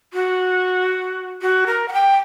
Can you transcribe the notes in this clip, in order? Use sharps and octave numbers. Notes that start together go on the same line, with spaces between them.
F#4
F#4
A#4
F#5
G5